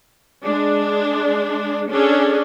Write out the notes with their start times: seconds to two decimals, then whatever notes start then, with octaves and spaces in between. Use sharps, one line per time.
0.45 G#3 D4
1.91 C#4 D4 G#4 A4